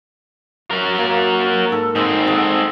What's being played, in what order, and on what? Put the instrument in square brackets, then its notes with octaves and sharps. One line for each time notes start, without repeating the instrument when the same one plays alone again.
[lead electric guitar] F#3 A#4
[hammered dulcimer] A#3
G#2 A4
[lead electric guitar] G#2 C4 [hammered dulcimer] G#4 A4
[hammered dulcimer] G#4 A4 F#5